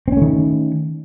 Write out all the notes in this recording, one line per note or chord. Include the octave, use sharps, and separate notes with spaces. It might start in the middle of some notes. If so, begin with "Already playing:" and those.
D#3 A3 C4 C#4